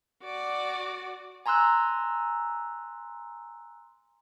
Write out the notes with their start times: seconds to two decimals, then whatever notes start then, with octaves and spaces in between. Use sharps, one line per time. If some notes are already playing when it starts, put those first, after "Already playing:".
0.23 F#4 D5
1.46 G#5 A#5 C6 E6 F#6